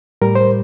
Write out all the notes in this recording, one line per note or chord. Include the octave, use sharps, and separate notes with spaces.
A2 G3 A#4
C5